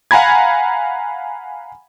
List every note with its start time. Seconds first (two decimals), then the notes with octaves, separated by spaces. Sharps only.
0.11 F5 F#5 G#5 A#5 B5 G#6